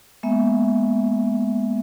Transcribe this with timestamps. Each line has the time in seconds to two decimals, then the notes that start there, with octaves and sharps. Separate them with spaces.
0.23 G#3 A#3 B3 E5